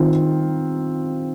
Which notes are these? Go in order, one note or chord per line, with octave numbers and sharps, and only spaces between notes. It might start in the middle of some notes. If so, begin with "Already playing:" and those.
Already playing: D#3 C4 F4